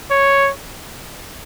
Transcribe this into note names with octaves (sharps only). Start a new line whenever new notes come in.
C#5